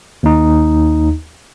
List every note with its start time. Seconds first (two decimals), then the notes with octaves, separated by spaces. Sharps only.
0.23 D#2 D#4